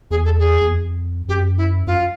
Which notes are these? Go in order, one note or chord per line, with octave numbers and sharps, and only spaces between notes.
E2 G#4
A4
G#4
E2
F2
F#2 G4
E4
F#2 F4